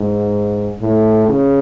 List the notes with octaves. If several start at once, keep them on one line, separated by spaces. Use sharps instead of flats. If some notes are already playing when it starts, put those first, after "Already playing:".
Already playing: G#2
A2
C#3